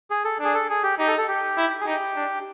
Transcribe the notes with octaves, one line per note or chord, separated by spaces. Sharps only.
G#4
A4
D4 G#4
A4
G#4
G4
D#4 G4
A4
A4
G4
E4
G#4
D#4 G4
D4